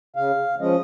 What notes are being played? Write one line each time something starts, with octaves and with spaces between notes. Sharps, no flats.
C#3 F5
F3 G#3 C#4 D#5